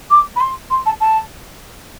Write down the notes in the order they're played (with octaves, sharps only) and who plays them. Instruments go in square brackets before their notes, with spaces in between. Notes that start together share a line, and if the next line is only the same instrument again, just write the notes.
[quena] D6
B5
C6
C6
A5
A5